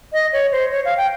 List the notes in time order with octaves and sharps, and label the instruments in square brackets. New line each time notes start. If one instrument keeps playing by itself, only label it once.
[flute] D#5
C#5
C5
C#5
F5
G5